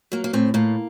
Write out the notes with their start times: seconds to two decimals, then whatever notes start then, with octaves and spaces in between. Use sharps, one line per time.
0.12 F#3 A#3
0.24 A#3
0.33 A2 C4
0.54 A2 A#3